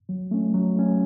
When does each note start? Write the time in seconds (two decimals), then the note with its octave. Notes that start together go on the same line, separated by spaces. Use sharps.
0.09 F#3
0.31 A3 C#4
0.54 F#3
0.76 A3 C#4